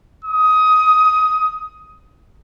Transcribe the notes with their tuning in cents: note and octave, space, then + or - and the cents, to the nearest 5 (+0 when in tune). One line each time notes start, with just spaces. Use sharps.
D#6 +15